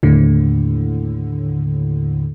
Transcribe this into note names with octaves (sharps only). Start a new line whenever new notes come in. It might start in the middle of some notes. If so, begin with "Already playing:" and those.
D#2 A2 D3